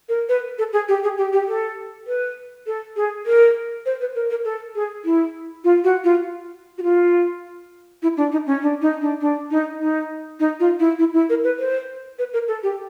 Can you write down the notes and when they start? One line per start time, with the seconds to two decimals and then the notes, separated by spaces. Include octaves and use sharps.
0.09 A#4
0.29 B4
0.58 A4
0.73 G#4
0.88 G4
1.03 G#4
1.18 G4
1.33 G4
1.48 A4
2.07 B4
2.66 A4
2.96 G#4
3.26 A#4
3.86 C5
4.00 B4
4.15 A#4
4.30 A#4
4.45 A4
4.75 G#4
5.05 E4
5.64 F4
5.84 F#4
6.04 F4
6.78 F#4
6.83 F4
8.02 E4
8.17 D4
8.32 D#4
8.46 C#4
8.62 D4
8.81 D#4
9.01 D4
9.21 D4
9.51 D#4
9.80 D#4
10.40 D#4
10.60 F4
10.79 E4
10.99 E4
11.14 E4
11.29 A#4
11.44 B4
11.59 C5
12.18 B4
12.33 A#4
12.48 A4
12.63 G4